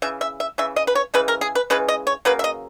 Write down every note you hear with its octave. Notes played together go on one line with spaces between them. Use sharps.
C#3 E3 E5
E5
E5
C#3 E3 E5
D#5
B4
C#5
C#3 E3 G#3 B4
A#4
G#4
B4
C#3 E3 G#3 B4
D#5
C#5
C#3 F#3 A#3 B4
E5
D#5